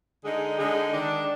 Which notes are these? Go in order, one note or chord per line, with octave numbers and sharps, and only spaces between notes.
D3 G#3 D#4 G#4
D3 G#3 D#4 G#4
D#3 G#3 D4